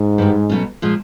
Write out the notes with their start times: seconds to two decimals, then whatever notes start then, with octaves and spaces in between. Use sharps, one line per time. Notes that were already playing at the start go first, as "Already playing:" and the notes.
Already playing: G#2
0.18 G2 D#3 G3
0.49 B2 F#3 A3 C#4
0.82 A#2 F3 G#3